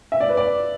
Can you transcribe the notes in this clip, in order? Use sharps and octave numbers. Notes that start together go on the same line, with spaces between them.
E5
D5
B4
D5